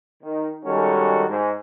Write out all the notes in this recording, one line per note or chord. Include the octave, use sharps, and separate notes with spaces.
D#3
D#3 G3 G#3 C#4 F#4 A4
G#2